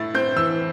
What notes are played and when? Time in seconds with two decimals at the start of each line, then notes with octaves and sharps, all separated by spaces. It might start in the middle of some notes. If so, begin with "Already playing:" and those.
Already playing: A2 E4 A6
0.14 C4 G6
0.36 E3 E6